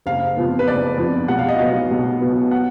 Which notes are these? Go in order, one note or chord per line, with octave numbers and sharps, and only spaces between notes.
F#1 F5
F2 F3 B3
B4
F#1 D5
F2 F3 B3
B1 F#5
F5
D#5
B2 F#3 B3 F5
B1
B2 F#3 B3
F#5